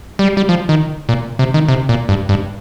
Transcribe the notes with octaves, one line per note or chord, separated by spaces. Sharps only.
G3
G3
F3
D#3
A#2
C3
D#3
C3
A#2
G2
G2